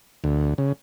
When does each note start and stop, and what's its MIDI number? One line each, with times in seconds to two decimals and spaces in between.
0.24 0.54 38
0.58 0.72 49